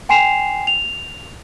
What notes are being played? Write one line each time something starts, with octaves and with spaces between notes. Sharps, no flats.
G5 G#5 C6 C7 E7 F7
F7